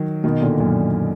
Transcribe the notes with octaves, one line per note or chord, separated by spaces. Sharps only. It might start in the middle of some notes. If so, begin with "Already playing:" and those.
Already playing: D#3 F#3
B2 D#3
A#2 D3
F#2 A#2